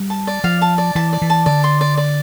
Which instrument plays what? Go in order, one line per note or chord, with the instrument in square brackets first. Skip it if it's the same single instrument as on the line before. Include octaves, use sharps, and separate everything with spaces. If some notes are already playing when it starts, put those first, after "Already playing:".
Already playing: [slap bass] G3
[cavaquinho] A5
D5
[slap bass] F3 [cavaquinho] F5
[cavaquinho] A5
D5
[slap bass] E3 [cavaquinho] A5
[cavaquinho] D5
[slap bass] E3
[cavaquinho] A5
[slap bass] D3 [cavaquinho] D5
[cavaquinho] C6
D5
D5